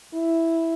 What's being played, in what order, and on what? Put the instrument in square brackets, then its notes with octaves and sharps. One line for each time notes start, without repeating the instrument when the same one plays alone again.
[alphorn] E4